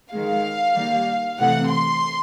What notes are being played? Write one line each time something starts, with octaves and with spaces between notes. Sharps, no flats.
D#3 G#3 F5
D#3 G3 A#3
C3 E3 A3 F#5
C6